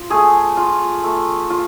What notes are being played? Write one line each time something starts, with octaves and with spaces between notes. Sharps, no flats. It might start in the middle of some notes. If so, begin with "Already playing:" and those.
Already playing: F4
A3 G#4
F4
A3
F4